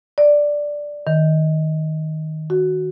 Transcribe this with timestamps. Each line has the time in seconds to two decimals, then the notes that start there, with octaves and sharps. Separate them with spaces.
0.18 D5
1.07 D#3
2.50 F#4